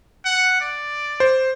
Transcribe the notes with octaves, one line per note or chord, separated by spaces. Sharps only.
F#5
D5
C5